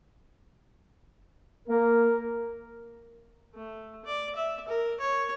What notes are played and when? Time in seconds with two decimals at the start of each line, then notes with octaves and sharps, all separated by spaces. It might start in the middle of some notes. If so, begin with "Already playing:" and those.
1.68 A#3 A#4
3.55 A3
4.05 D5
4.36 E5
4.68 A#4
5.00 C#5